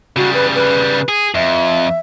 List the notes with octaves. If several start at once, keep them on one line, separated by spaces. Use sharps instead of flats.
C#3 G3 F#4
B4
B4
G#4
F2 E5